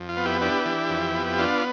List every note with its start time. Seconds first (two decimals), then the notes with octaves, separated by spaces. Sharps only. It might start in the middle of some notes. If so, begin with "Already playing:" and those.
Already playing: F2
0.09 F4
0.17 B3
0.25 E4 G4
0.41 D4 E4 G4
0.66 E3
0.90 F2
1.15 B3
1.39 D4 F4